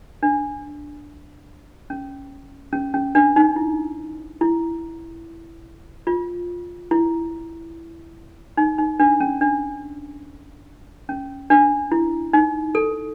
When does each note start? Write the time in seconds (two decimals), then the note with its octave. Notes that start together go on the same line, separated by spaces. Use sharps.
0.23 D4
1.90 C#4
2.73 C#4
2.94 C#4
3.15 D4
3.36 D#4
3.56 E4
4.41 E4
6.07 F4
6.91 E4
8.57 D#4
8.78 D#4
9.00 D4
9.20 C#4
9.41 D4
11.09 C#4
11.50 D4
11.92 E4
12.33 D#4
12.75 A4